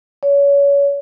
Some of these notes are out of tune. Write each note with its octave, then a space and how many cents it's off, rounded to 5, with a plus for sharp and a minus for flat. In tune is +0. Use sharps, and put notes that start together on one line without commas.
C#5 +30